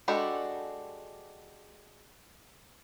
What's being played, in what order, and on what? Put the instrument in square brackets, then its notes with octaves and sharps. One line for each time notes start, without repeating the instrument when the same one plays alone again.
[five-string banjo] G#3 D4 F#4 G4 A4